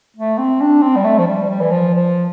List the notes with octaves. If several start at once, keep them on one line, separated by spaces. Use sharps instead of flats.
A3
C4
D4
C4
G3
A3
F3
G3
G3
E3
F3
F3